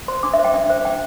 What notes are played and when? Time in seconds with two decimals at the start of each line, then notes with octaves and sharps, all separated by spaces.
0.08 C5 C6
0.23 D4 D6
0.34 E5
0.39 C5
0.44 G5
0.54 D4 E5
0.70 C5
0.85 D4 G5